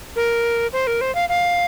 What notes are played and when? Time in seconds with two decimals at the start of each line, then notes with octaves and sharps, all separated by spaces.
0.16 A#4
0.73 C5
0.87 A#4
1.01 C5
1.15 F5
1.29 F5